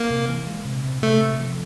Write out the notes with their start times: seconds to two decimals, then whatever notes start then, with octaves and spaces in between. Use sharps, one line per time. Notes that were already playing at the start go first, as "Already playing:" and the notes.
Already playing: A#3
0.10 C3
0.28 E3
0.47 G#3
0.65 C3
0.84 C3
1.02 C3 A3
1.21 C3
1.40 F3